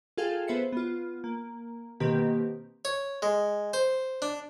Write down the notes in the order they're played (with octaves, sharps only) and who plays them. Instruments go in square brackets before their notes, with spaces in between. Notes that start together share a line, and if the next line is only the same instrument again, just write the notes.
[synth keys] F4 G#4 A4 F5 G5
B3 B4 C5 E5 C7 C#7
B3 F4
A#3
B2 D#3 A#3 C4 G4 B4
[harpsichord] C#5
G#3
C5
D4